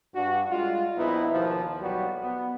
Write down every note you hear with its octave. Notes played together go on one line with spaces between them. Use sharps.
G2 D4 F#4
G3 G#3 F4
A#1 B3 D#4 E4
D#2 B2 F3
B1 F#3 G3 B3 F#4
B3